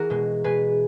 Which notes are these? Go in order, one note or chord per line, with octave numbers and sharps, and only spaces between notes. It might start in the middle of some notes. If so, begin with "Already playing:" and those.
Already playing: E3 E4 F#4 G#4 A#4
B2 G#3
B2 G#3 G#4 B4